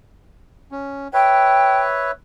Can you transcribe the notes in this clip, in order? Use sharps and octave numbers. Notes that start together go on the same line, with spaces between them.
C#4
B4 C#5 E5 G5